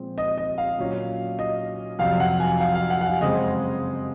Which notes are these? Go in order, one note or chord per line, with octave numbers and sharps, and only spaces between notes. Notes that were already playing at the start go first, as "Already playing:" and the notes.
Already playing: A#2 F3 G#3 C4
D#5
D#5
F5
A#2 F#3 C#4
D#5
F2 C3 F#3 F5
F#5
G#5
F5
F5
F#5
F#5
F5
F#2 C#3 G#3 C4 D#5